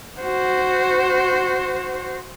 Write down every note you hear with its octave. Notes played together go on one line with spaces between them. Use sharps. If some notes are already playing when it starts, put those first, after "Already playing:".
F#4 C5